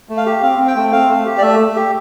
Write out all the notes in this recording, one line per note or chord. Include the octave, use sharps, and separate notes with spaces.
A3
F5
G4
C4 F5
C4
G5
A3
C4 F5
A3
G4
D5
A3 E5
A3
G4